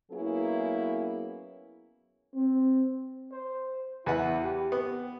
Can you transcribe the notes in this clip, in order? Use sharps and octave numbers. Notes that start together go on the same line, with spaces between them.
F#3 A#3 B3 C#4 E4 G#4
C4
C5
E2 E4 B4 F#5
G4
B3